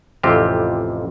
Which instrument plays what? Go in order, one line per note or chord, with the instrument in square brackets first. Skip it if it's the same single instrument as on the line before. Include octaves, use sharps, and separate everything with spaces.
[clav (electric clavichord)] A1 F2 C3 C4 F4 G4